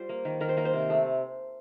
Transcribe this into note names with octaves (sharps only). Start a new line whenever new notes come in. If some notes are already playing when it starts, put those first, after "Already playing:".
Already playing: G3 F4 C5
A#3
D#3
D#3 A#4
C5
A#3 A#4
C5
C3
A3